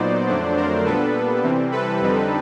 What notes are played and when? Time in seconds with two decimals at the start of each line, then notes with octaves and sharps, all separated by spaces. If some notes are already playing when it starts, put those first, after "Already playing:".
Already playing: A#2 F#3 B3 D#4 C5 D5
0.27 F2 D3 F#3 A3 D4
0.57 A#4 C5
0.86 A#2 G3 B3 D4 A4 B4
1.43 C3 E3 G3 C4
1.72 A4 B4
2.00 F2 D3 G3 C4 D#4